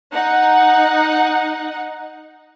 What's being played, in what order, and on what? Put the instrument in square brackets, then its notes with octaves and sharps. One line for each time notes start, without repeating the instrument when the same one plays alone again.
[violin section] D#4 F#5